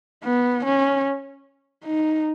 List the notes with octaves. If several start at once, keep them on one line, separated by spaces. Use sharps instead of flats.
B3
C#4
D#4